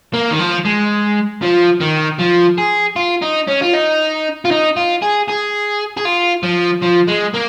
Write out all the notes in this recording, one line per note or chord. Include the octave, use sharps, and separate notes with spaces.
A#3
D#3
F3
G#3
F3
D#3
F3
G#4
F4
D#4
C#4
F4
D#4
F4
D#4
F4
G#4
G#4
G#4
F4
F3
F3
G#3
A#3